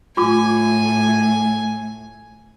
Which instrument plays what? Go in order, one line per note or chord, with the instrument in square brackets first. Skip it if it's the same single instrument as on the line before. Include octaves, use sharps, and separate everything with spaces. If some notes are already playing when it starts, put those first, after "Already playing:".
[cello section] A2 [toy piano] F4 D6 [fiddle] G#5